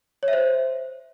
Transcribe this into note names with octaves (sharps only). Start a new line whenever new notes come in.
C#5
E5
C5